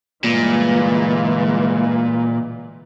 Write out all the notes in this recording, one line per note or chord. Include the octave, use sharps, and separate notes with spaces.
G1 A#2 E3 G#3